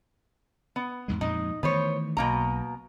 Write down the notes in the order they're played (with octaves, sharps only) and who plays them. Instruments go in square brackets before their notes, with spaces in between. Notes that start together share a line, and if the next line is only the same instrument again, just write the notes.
[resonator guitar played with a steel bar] B3
[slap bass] E2 G#2 G#3
[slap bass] F2 A#2 G#3 [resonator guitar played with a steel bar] D#4
[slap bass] D#3 E3 A3 [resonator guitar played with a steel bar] B3 C5 C#5
[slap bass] B1 [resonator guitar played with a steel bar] B2 A#3 A#5